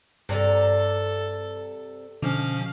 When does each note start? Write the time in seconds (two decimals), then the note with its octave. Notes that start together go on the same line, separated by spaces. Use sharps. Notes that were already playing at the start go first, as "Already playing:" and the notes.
0.29 G2 C3 A4 D5 A#5
2.23 B2 D3 F3 C#4 F5